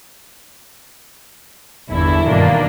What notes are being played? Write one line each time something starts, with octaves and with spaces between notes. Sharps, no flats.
G1 E2 G2 E4 A4
G2 B2 D#3 A#3 D4